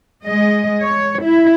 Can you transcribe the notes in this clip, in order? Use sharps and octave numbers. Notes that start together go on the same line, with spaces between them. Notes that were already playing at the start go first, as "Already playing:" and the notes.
G#3 D#5
C#5
E4